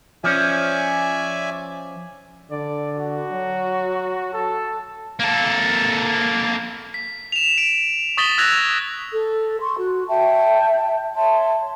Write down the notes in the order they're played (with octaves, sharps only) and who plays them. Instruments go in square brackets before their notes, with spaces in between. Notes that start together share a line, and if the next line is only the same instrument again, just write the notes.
[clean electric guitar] F3 C#4 [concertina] D5 E5 G#5
[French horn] D3 [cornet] D5
[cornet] F#4
[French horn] F#3
[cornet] A4
[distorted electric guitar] A#3 A4
[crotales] B6
E7 F7
D7
C#6 D#6 A6 B6 F#7 G7
E6 F#6 G#6 A#6 F7
[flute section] A4
C6 C#6
F#4
E5 G5 A5
C#5 E5 A5 C6